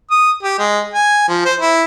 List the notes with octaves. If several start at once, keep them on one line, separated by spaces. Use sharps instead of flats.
D#6
G4
G#3
G#5
F3
C5
E4